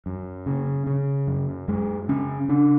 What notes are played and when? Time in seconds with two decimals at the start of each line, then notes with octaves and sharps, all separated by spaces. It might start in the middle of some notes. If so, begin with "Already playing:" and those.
0.06 F#2
0.46 C#3
0.87 C#3
1.27 F#2
1.68 F#2 G#3
2.08 C#3 C#4
2.49 C#3 D4